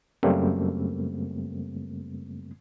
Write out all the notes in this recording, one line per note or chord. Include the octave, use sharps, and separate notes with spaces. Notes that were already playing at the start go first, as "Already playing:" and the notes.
F#2 C#3 G3 A3 A#3 C4